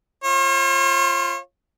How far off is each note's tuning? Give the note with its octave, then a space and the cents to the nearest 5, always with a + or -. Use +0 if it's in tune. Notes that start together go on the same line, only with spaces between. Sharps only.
F4 -10 C#5 -45